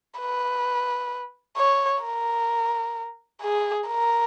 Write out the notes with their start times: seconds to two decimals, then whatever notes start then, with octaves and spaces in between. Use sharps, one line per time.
0.20 B4
1.57 C#5
2.03 A#4
3.42 G#4
3.88 A#4